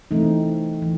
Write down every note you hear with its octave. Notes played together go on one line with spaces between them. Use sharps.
E3 A3 C4 D#4
E3